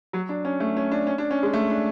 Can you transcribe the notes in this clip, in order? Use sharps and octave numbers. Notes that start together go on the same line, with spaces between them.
F#3
D4
C#4
A3
C#4
D4
C#4
D4
C#4
G#3
A3
D4